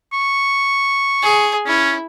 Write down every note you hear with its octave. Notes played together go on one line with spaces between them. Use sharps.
C#6
G#4
C#4 E4